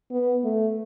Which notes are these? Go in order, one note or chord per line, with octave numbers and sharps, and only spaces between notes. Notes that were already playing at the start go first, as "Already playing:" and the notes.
B3
A3